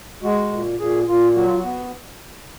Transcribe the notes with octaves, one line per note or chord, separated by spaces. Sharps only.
G#3 F#4
A#2
A#2 G#4
A#2 F4
F#3 F#4
F4
F#4
B3